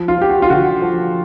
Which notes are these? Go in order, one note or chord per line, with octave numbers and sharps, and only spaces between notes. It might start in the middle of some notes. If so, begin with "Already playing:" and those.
Already playing: F3
F4
F3 G4
F#4
F4
D3 F#4
F3